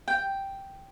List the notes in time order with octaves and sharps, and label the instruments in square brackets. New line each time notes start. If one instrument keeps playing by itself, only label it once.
[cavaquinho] G5